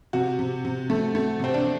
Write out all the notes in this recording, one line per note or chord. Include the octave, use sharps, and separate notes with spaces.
C3 F#4
C3
C3
A3
A3
C3 C4
D4